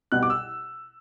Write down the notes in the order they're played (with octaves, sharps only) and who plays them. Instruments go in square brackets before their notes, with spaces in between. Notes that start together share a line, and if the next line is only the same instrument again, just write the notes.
[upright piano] C2 B2 G3 F#6
D6
E6